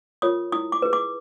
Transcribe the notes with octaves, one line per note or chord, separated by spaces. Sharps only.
F4 A#4 C#5 D#6
E4 D#6
D6
G#4 B4
D6